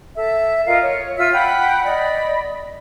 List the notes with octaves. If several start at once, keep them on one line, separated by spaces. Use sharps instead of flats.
A4 E5
F4 A#4 D#5 F5
C#5
F4 E5 E6
F#5 G5 B5
D5 D#5 B5